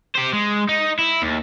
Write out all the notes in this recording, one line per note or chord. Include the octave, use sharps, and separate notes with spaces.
G4 C5
G#3
D#4
E4
D#2